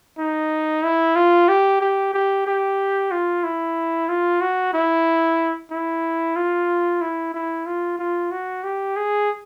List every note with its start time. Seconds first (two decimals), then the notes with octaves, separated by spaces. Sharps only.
0.18 D#4
0.84 E4
1.16 F4
1.48 G4
1.81 G4
2.14 G4
2.47 G4
3.11 F4
3.44 E4
4.09 F4
4.41 F#4
4.73 E4
5.71 E4
6.36 F4
7.01 E4
7.34 E4
7.66 F4
7.99 F4
8.31 F#4
8.64 G4
8.96 G#4